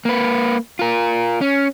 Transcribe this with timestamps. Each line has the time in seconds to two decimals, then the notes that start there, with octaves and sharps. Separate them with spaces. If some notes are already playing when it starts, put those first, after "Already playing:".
0.05 A#3 B4
0.79 F4 A#4
1.41 C#4